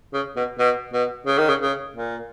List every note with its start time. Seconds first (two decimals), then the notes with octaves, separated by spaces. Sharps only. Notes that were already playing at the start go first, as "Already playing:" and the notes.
0.14 C#3
0.36 B2
0.59 B2
0.93 B2
1.27 C#3
1.38 D#3
1.48 C#3
1.62 C#3
1.95 A#2